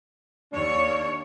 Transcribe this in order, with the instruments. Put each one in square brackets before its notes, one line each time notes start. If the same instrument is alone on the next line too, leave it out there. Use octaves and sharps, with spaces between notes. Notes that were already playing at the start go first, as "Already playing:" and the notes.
[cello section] D#2 C#5 [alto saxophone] D4